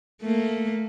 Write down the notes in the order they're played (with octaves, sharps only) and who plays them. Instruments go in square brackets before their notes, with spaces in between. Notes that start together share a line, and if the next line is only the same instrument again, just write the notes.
[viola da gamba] A3 A#3